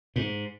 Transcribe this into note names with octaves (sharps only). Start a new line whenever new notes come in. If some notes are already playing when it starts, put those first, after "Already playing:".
G#2